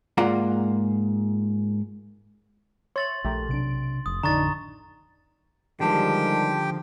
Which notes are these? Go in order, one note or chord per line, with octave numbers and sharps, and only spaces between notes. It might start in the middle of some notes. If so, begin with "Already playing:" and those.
G#2 A#3 F4 D5 F#5 A#5
C#5 E5 C6 A6 F#7
A#1 A3 G4 A#4
B1 C3 D4 D7
F1 D#6
A1 F2 D3 D4 D#4 A#5 C#6 A6
D3 D#3 F3 G3 G#3 G4 G5 A5